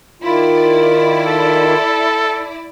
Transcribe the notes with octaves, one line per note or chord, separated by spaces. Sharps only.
D#3 E4 F4 D5
A4